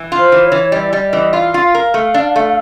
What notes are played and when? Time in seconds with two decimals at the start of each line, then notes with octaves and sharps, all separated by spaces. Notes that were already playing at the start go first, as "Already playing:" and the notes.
Already playing: E3
0.12 F4
0.19 C5
0.32 E3
0.45 C#5
0.52 E3
0.63 C#5
0.72 G3 D#5
0.77 D5
0.93 G3 D#5
1.13 E3 D#5
1.33 F4 F5
1.54 F4
1.75 A#4
1.94 A3
2.14 D4
2.36 A3